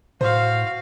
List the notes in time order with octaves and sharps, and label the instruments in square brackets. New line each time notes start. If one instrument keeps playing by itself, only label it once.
[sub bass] A2 [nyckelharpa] F#4 F5 [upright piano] C5